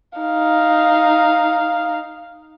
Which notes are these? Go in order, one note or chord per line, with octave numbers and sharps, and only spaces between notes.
D#4 F5